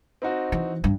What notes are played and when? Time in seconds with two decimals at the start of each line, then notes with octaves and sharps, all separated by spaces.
0.22 C4 D#4 F#4
0.52 E3
0.84 G2